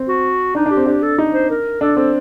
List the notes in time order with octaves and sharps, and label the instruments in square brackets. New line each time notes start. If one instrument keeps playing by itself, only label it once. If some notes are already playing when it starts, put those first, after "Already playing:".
Already playing: [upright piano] C4
[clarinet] F#4
[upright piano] D4 [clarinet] D#4
[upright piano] D4
[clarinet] G4
[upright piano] C4
[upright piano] D4 [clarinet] G4
[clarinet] A4
[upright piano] D#4
[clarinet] C5
A#4
[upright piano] D4 [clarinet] A4
[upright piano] C4 [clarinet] A4